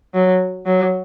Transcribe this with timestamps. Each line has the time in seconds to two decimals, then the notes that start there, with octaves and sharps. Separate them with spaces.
0.14 F#3
0.66 F#3